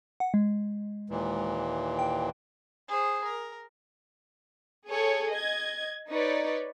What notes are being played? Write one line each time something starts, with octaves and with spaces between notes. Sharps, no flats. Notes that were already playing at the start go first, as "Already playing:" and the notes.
F#5
G#3
D#2 A#2 E3
G5
G#4 C5
A#4
G#4 A4 C#5
D#5 G#6
D#4 B4 C#5 D5